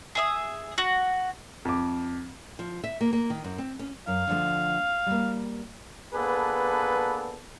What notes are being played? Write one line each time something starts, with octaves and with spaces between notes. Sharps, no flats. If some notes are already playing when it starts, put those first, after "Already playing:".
G#4 E5 D#6
F#4
F2 D6
F3
E5
A#3
A#3
D#3
F#2
C4
C#4
F#2 F5
D3 F3 A3
G3 A#3
A#3 B3 D4 G#4 A4 B4